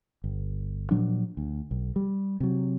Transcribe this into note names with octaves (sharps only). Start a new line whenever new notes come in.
G1
A#2 F3 F#3 D4
D2
B1
G3
C3 F#3